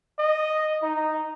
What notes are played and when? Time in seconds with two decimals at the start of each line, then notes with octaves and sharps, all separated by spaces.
0.19 D#5
0.83 D#4